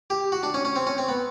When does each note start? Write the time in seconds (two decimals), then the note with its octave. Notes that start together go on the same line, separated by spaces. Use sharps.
0.10 G4
0.32 F#4
0.43 D4
0.54 C#4
0.65 C#4
0.76 C4
0.87 C#4
0.98 C4
1.08 B3